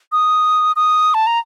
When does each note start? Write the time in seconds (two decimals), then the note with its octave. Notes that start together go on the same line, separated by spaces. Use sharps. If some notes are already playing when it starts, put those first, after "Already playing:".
0.12 D#6
0.76 D#6
1.14 A5
1.27 A#5